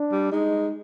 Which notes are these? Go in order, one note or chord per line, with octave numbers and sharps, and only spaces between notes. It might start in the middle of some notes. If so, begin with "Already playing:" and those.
Already playing: D4
G3
G#3 D#4